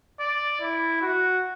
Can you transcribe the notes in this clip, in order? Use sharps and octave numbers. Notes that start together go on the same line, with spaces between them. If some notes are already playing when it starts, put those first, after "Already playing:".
D5
E4
F#4